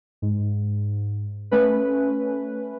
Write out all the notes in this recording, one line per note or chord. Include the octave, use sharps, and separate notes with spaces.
G#2
A3 C#4 B4